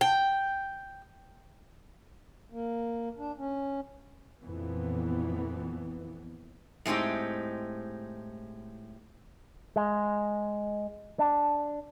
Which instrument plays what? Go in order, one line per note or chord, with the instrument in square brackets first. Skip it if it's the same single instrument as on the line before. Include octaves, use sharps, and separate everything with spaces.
[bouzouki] G5
[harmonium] A#3
D4
C#4
[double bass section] F2 A#2 E3 B3
[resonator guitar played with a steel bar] A2 G#3 C4 D#4 G4
[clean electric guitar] G#3
D4